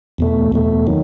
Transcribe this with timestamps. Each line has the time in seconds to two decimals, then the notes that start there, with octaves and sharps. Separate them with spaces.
0.18 E2 B2 A3
0.52 E2 B2 A3
0.87 D#3 F#3